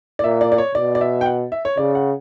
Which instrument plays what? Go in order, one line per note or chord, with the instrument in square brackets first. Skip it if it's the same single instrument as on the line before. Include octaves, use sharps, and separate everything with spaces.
[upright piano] D5
[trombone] A#2 [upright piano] E5
[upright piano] D5
D5
C#5
[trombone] B2 [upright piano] D5
[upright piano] D5
E5
G5
F#5
E5
C#5
[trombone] C#3 [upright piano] D5
[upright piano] F#5